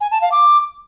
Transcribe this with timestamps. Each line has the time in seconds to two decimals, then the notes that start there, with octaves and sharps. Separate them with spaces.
0.01 G#5
0.11 A5
0.21 F5
0.32 D6